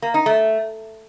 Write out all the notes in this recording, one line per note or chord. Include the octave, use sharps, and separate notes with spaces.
A#3
D#4
A3